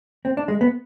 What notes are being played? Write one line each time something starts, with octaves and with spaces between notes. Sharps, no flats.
C4
D4
G#3
B3